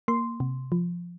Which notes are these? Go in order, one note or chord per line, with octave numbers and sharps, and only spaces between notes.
A#3 C6
C3
F3